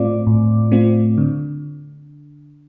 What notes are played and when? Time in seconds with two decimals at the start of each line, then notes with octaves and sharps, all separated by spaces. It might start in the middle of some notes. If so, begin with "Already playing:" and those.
Already playing: A2 A3 C4 F4 D5 D6
0.27 A2
0.71 A3 C4 F4
1.18 D3